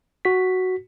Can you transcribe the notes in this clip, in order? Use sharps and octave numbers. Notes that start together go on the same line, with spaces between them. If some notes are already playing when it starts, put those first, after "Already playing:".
F#4 B6